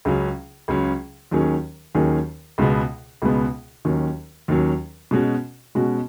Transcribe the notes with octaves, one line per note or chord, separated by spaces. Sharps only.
C#2 C#3 F#3 C#4
C#2 C#3 F#3 C#4
D#2 D#3 F#3 C#4 G#4
D#2 D#3 F#3 C#4 G#4
C#2 B2 G#3 B3
C#2 B2 G#3 B3
D#2 D#3 F#3 C#4
D#2 D#3 F#3 C#4
B2 G#3 C#4 F#4
B2 G#3 C#4 F#4